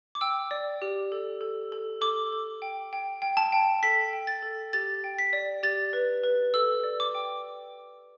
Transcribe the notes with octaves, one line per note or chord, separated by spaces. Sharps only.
D6
G5 E6
D5
G4
A4
A4
A4
A4 D6
A4
G5
G5
G5
A5
G5
A4 B6
G5
A6
A4
G4 A6
G5
B6
D5
G4 A6
B4
B4
A4 E6
D5
D6
G5